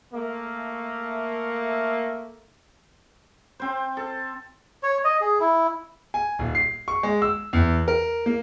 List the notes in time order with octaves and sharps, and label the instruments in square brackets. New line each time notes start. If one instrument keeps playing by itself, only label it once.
[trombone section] A3 A#3
[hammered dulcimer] C4 C5
A4
[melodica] C#5
D#5
G#4
E4
[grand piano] G#5
D#1
C7
C#6
G#3
E6
E2
A#4
A#3